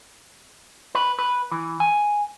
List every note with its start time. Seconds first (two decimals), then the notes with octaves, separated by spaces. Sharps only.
0.95 B4
1.19 B4
1.52 E3
1.80 G#5